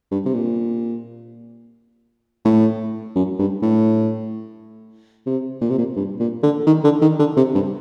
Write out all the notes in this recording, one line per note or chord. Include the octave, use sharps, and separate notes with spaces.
G2
C3
A#2
A2
F#2
G2
A2
C3
A#2
C3
A#2
G2
A#2
D3
D#3
D3
D#3
D3
C3
G2